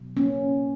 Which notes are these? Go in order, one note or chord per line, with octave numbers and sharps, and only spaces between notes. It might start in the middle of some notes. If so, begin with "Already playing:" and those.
Already playing: B2 F#3
A#3 C#4